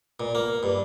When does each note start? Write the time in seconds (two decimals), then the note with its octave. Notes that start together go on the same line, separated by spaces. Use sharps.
0.20 A#2
0.35 A#3
0.63 G2